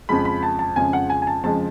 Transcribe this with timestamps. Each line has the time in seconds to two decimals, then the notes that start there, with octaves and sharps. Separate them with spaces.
0.09 F2 C#3 F3 G#3 B5
0.25 B5
0.43 A5
0.59 A5
0.76 F2 C#3 F3 G#3 G#5
0.93 F#5
1.10 G#5
1.22 G#5
1.27 A5
1.43 F2 C#3 F3 G#3 A5